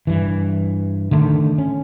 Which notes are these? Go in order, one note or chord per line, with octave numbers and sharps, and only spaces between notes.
G2 E3
D3 D#3 A3
C#4